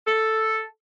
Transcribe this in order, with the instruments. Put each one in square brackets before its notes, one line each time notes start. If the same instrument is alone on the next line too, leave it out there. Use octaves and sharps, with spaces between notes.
[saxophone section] A4